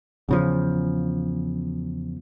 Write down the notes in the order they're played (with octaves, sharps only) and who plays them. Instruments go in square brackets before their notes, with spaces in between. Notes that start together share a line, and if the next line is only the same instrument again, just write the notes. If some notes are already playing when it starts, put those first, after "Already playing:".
[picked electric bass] E2 C#3 F3